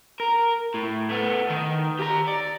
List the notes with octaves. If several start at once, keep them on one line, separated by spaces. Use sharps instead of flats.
A#4
A2
A3 B3
D#3
G4 A#5
D5